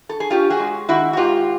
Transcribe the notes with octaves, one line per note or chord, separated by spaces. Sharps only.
A4
G#4
C#4 F4 G4
F#4 G#4
G#3
D#3 E4 F#4
F#4
G#2 F4 G4